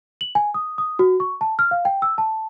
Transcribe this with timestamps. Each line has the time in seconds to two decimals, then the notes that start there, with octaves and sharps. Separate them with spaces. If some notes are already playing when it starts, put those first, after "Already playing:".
0.21 F#7
0.35 G#5
0.54 D#6
0.78 D#6
0.99 F#4
1.20 C#6
1.41 A5
1.59 F6
1.71 F5
1.85 G5
2.02 E6
2.18 A5